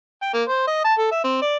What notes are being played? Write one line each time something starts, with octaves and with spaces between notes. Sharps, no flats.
G5
A#3
C5
D#5
A5
A4
E5
C4
D5